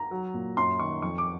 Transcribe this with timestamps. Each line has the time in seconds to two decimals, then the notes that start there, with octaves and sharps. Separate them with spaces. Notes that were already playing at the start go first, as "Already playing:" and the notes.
Already playing: A#5
0.11 F#3
0.34 A#2
0.57 F#2 C6
0.79 D#3 C#6
1.02 F2 C#6
1.18 D6